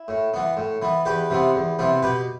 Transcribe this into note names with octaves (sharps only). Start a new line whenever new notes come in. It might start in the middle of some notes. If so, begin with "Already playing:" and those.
Already playing: E4
A2
E3 B3
A2
E3 B3
E2 G4 B4
C3 E3 B3
E2
C3 E3 B3
B2 G4 B4